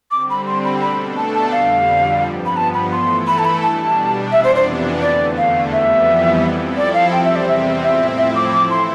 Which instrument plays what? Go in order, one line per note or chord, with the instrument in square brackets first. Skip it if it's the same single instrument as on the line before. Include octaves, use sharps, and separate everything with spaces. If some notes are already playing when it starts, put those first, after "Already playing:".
[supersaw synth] D3 G3 C4 [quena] D6
[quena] B5
C6
B5
[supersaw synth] B2 A3 D4 A4 [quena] B5
[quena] A5
A5
[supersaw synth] F2 D3 G3 [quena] F5
[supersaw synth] G2 F3 B3
[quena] B5
A5
B5
[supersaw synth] E3 A3 E4 A4 [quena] C6
[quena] B5
A5
B5
[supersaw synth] B2 G3 D4 [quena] A5
[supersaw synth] F2 C3 E3 B3 D4 [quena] E5
[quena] C5
C5
[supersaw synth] E2 D3 A3 [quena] D5
[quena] F5
[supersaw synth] F2 E3 G3 B3 [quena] E5
[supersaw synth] F3 C4 E4 A4
[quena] D5
F5
[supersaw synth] E2 C3 G3 C4 [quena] G5
[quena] E5
D5
E5
[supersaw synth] A2 F3 C4 E4 [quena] E5
[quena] E5
D6
[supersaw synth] E3 A3 E4 A4 [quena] D6
[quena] C6